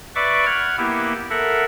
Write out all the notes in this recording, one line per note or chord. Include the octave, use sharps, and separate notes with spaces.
B4 D5 E5 C#6 D6
F#5 F6 G#6
A#3 B3 E4 G4
A4 A#4 E5 F#5